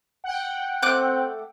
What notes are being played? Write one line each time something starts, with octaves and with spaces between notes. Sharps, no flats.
F#5 G5
A3 C4 D6 F#6